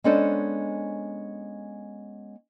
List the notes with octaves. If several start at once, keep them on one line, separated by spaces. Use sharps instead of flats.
G#3 B3 C#4 D4 A4 C5